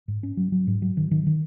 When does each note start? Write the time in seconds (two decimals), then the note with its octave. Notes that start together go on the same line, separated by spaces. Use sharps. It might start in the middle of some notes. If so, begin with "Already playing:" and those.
0.08 G#2
0.23 C#4
0.37 F#3
0.52 F#3
0.67 G#2
0.82 F#3
0.97 D#3
1.11 D#3
1.27 D#3